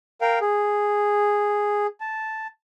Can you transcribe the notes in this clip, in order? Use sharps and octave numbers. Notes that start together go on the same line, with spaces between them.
A#4 F5 G5
G#4
A5